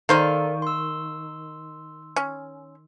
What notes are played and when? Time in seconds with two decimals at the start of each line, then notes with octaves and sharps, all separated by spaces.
0.09 D#3 A#3 A4 C5 D5 F5
0.62 C6 E6
2.16 C#4